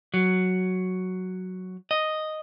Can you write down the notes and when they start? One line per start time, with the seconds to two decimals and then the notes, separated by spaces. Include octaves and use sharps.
0.14 F#3
1.91 D#5